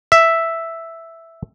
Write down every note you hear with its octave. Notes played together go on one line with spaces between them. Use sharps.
E5